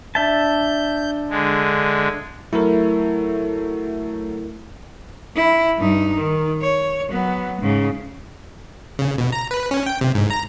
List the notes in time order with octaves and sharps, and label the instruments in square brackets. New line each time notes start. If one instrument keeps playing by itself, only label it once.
[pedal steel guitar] D4 E5 A5 [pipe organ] G6
[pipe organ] D3 G#3
[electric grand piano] F#3 A3 [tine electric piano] E4 A#4
[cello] E4
G2 D#4
D#3
C#5
F#3 B3
G#2 C#3
[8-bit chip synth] C#3
B2
A#5
B4
C#4
G5
C3
G#2
A#5